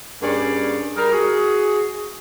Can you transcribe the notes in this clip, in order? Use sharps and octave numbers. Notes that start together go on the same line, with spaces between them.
G2 A#3 C#4 G#4 D5
G3 G#4 A#4
F#4 G#4